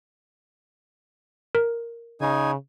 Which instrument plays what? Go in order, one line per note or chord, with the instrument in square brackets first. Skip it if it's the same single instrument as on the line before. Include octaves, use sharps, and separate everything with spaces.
[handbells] A#4
[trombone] C#3 [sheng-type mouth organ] D#4 G#5